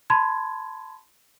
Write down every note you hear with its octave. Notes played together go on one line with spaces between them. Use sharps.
A5 B5 C6 G#6